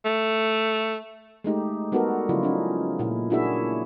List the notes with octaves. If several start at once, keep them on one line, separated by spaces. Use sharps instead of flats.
A3
G#3 A3 D#4 G4
G3 B3 D#4 F#4 A4 A#4
C#3 F3 F#3 E4 F4
C#4 D#4
A#2 E4
A#3 D4 E4 F#4 G#4 E5